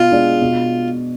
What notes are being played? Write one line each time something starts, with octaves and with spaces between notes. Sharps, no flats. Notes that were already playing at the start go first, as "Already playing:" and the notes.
Already playing: B2 F4
G#3 D4 G#4 D5
B2